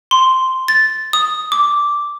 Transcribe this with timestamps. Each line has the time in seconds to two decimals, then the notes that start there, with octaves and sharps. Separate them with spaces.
0.11 C6
0.68 A6
1.13 D#6
1.52 D6